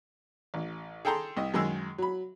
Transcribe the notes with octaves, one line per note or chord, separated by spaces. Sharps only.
A1
G#4 A4 G5 A5 A#5 C6
C2 D#5
F#2 D#3 G#3 G#4 E6
F#3 B5